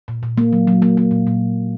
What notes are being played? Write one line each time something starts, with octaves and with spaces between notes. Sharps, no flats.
A#2
A#2
A#3
F#3
F#3
A#3
A#3
A#2
A#2